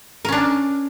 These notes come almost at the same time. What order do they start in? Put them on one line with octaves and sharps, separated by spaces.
A#4 C#4 D4